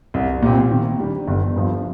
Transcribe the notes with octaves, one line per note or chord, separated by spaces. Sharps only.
C2
A#2 G3 C4
D#3
G3 D4
G1
G2 F3